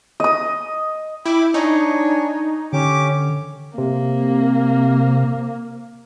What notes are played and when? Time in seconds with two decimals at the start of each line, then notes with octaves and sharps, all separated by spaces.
0.20 D#5 D#6
1.26 E4 G5 B5 D6
1.54 D4 D#4 C#5 G#5
2.73 D3 C#4 G4 D6
3.78 C3 A#3